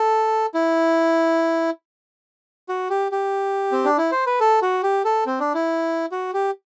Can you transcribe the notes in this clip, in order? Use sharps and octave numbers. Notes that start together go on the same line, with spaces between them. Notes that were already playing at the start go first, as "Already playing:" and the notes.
Already playing: A4
E4
F#4
G4
G4
C4
D4
E4
C5
B4
A4
F#4
G4
A4
C4
D4
E4
F#4
G4